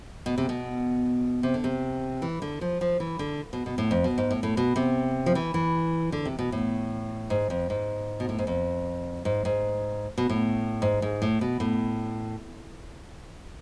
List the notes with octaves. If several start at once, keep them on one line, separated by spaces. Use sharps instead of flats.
B2
C3
B2
C3
D3
C3
E3
D3
F3
F3
E3
D3
B2
B2
A2
F2
B2
G#2
A2
A2
B2
C3
F3
E3
E3
D3
C3
B2
A2
G#2
F2
G#2
B2
A2
G#2
F2
G#2
G#2
B2
A2
G#2
G#2
A2
B2
A2